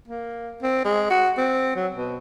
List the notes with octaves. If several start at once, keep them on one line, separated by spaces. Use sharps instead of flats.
A#3
C4
G#3
F#4
C4
F#3
B2